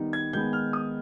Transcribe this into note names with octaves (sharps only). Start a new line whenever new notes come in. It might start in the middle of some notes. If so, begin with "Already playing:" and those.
Already playing: D#3 G3 B3 D#4
G#6
D#3 G#3 B3 G6
F6
D#6